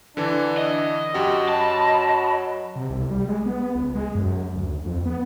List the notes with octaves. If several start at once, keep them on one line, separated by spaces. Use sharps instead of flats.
D3 E3 D4
D#5
F#2 F#4 G4
F#3 D#5 A5 B5
C3
C2
G3
G#3
B3
C#2
G#3
F#2
D2
F2
B3